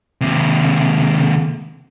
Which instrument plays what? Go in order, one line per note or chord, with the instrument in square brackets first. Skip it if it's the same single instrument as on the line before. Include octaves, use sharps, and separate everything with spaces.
[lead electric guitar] D#2 C3